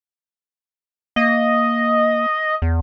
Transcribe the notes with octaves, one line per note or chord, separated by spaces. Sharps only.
A#3 D#5
E2